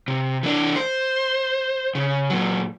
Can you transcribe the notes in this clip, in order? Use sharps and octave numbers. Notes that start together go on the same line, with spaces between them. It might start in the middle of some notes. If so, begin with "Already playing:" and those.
C3
E3 D4
C5
C#3
A#2 F#3